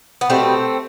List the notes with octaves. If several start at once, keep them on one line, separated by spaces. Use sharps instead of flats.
B3
B2 G3 A3 C4